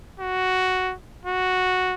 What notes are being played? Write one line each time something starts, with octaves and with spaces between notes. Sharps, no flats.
F#4
F#4